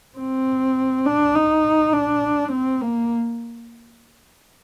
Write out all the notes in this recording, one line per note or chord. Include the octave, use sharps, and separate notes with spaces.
C4
D4
D#4
D4
C4
A#3